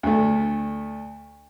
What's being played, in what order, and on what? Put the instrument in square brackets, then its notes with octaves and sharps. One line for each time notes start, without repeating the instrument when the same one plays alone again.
[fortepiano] D2 A3